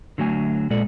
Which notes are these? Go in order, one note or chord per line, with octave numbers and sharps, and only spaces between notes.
D3 F#3 A3 G#5
A#2 G#3 A4 D5